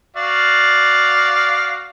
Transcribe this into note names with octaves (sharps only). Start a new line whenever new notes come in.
F#4 D5 F5